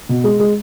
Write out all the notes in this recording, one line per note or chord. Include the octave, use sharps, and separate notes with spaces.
B2
G#3
G#3